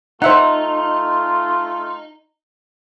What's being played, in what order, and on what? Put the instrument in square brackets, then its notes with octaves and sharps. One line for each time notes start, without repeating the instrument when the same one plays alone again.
[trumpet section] A3 F4 [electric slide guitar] D#4 [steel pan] C5 E5 F#5